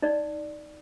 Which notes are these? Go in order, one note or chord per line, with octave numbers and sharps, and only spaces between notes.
D#4 D5